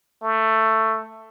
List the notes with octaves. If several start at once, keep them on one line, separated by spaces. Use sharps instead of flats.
A3